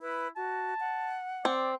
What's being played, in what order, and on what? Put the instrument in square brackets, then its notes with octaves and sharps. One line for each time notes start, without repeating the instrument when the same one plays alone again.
[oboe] E4 [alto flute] B4
[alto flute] F#4 [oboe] A5
[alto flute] F#5
[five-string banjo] C4 [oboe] D5